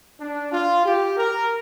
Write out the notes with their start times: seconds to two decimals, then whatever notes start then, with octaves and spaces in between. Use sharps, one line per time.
0.20 D4
0.52 F4
0.85 G4
1.17 A#4